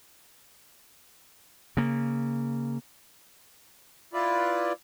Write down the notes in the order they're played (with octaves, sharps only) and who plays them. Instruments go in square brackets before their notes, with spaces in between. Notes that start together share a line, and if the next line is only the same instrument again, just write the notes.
[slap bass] C#3 A#3
[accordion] E4 F4 B4 D5